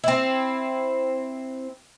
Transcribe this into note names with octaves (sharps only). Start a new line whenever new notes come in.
C4 E4